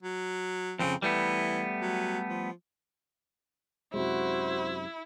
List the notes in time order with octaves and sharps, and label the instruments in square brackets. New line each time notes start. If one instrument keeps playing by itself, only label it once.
[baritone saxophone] F#3
[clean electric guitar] F2 A2 C#3 [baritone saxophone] C4
[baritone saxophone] E3 [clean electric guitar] G3 A3 B3
[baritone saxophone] F#3
F3
[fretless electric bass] F#2 C3 G#3 [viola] E4 [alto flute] F#4 [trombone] C5